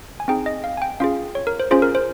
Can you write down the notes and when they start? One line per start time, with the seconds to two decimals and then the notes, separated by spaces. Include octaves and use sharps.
0.20 G#5
0.28 C4 D#4 G#4 G5
0.46 D#5
0.64 F5
0.77 G#5
0.82 G5
1.00 C#4 F4 G#4 F5
1.35 C#5
1.47 A#4
1.60 C5
1.71 C#4 F4 G#4 C5
1.82 A#4
1.95 C5